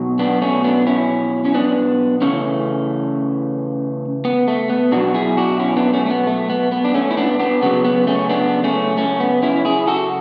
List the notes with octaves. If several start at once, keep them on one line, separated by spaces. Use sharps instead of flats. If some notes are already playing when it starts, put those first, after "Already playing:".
Already playing: B2 F#3
B3 D4
A3 C#4
B3 D4
C#4 E4
C#4
B3 D4
C#3 E3 A3 C#4
B3
A3
B3
B2 F#3 D4 F#4
E4 G#4
D4 F#4
C#4 E4
B3 D4
A3 C#4
A3
B3
A3
B3
B3
D4
A3 C#4
E4
B3 D4
B3 D4
C#3 F#3 B3
B3
A3 C#4
B3 D4
A3 C#4
A3 C#4
B3
C#4 E4
E4 G#4
F#4 A4